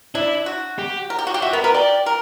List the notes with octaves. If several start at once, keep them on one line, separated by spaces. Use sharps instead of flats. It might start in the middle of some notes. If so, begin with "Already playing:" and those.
D4 E4
F#4
G4
A#4
G4
F#4
G4
F#4 E5
B3 A#4
A#4 B4
G4 D5
A#4